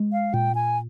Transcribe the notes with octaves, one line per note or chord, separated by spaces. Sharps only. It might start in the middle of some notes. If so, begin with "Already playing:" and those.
Already playing: G#3
F5
A#2 G5
G#5